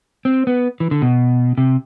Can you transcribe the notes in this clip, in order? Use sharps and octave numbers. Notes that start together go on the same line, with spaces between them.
C4
B3
E3
D3
B2
C3